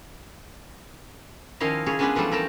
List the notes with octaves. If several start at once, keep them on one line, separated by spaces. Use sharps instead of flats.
D#3 F3 C#4 E4 D#5 F5
C#3 G#4 C#5
G#3 B3 C#4 D4 G#4 B4
E3 F3 G3 A3 A4
A3 A#4 G5 A5